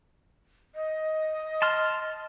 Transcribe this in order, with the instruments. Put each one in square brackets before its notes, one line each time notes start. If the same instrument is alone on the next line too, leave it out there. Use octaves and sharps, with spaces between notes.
[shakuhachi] D#5
[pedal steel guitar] A5 C6 F6